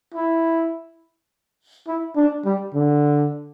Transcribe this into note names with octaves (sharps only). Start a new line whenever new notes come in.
E4
E4
D4
G3
D3